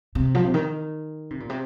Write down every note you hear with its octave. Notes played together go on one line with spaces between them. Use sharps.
C3
F3
C3
D#3
C3
A#2
C3